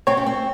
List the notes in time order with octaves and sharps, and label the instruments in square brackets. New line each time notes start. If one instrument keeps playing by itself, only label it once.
[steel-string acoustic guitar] C4 [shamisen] C#5
[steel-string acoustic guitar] C#4
C4